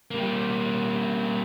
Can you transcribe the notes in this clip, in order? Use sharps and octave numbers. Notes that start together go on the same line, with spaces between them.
G3 A#3